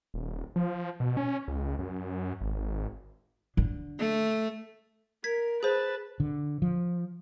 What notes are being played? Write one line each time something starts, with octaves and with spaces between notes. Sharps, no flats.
D#1
F3
B2
C#4
C#2
F#2
G#1
D3
A3
A#4 G#6 B6
G#4 B4 C5 A5
D3
F3